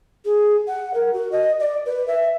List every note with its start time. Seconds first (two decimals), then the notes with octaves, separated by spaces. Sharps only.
0.24 G#4
0.67 F#5
0.93 A#4
1.13 F#4
1.32 D#5
1.59 D5
1.85 B4
2.07 E5